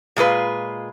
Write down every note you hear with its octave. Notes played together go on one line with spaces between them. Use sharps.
A#2 G#3 F4 B4